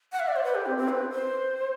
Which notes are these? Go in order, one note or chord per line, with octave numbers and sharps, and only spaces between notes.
F#5
E5
D5
C5
B4
G4
C4
C4
B4
C5